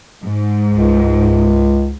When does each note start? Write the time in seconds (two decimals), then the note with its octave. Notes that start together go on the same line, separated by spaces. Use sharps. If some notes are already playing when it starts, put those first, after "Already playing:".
0.23 G#2
0.72 C#2